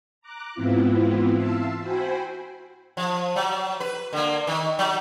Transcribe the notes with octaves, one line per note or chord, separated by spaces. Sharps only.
A#5 D6 F#6
G#2 E3 B3 C4 E4 F4
E5 F5 A5 C6 E6
F#4 C5 G5 G#5 B5 C6
F3
F#3
B4
D3 A#3
D#3
F#3